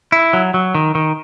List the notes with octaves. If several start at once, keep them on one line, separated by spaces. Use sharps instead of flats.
E4
F#3
F#3
D#3
D#3